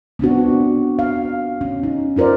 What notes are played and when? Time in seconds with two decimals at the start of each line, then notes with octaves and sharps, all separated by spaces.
0.19 B3 C4 D4 F#4
0.99 F5
1.61 C#4
1.83 D#4
2.16 D#4 F4 A#4 C5 D5